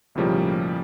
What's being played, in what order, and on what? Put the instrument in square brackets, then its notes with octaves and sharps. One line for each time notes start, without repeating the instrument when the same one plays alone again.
[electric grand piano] B1 A2 C#3 F3 G3 A#3